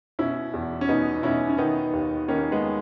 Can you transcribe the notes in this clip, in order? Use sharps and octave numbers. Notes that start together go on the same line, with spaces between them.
B2 C#4 E4
E2
C#4
B2 B3 D#4
B2 C#4 E4
C#4
D#3 B3 D#4
D#2
D#3 A#3 C#4
G#3 B3